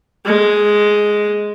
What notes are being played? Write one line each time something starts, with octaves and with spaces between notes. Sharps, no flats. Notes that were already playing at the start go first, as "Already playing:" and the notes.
G#3